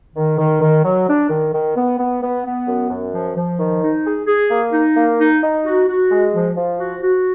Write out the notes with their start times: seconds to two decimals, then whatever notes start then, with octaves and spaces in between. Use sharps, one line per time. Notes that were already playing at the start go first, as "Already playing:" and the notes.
0.16 D#3
0.38 D#3
0.61 D#3
0.84 F#3
1.08 D4
1.29 D#3
1.53 D#3
1.76 B3
1.98 B3
2.22 B3
2.45 B3
2.67 F#2
2.90 F#2
3.12 F3
3.35 F3
3.59 D#3
3.82 D#4
4.05 G#4
4.27 G#4
4.50 A#3
4.72 D#4
4.96 A#3
5.19 D#4
5.42 D#4
5.64 F#4
5.87 F#4
6.10 G#3
6.33 F3
6.56 F3
6.78 F#4
7.01 F#4